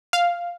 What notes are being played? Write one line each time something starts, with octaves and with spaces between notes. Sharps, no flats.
F5